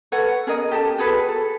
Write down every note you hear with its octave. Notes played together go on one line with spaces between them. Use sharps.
A4 B4 C#5 F#5
C#4 G#4 A#4 D#5
G4 A4 C#5 A5
F#4 G#4 A4 B4
A4